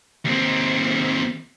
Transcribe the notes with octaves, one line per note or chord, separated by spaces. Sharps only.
D#2 C4